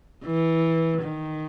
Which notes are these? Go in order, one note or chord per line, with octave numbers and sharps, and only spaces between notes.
E3
D#3